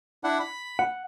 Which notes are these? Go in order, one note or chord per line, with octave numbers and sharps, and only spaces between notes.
D4 E4 F#5
B5
F#5